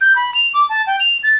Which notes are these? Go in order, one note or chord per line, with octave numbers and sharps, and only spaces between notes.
G6
B5
F7
D6
A5
G5
F7
A6